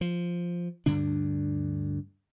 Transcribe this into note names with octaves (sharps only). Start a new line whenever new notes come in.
F3
D2 G2 D3 D4